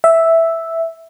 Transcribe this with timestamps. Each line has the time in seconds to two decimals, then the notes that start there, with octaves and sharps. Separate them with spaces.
0.04 E5